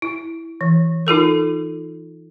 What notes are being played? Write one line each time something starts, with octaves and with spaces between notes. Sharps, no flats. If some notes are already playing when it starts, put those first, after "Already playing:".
E4
E3
D#4 F4 A4 A#4